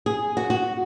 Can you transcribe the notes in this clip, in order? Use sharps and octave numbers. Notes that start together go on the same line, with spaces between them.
G#4
F#4
F#4